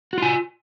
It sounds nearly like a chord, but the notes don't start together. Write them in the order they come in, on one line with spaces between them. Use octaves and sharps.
F#4 F4 G#5